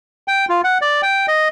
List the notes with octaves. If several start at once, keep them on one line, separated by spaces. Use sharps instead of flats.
G5
F4
F#5
D5
G5
D#5